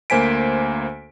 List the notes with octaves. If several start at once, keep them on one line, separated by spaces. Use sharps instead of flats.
D2 A#3 C5 G#5 B6 D7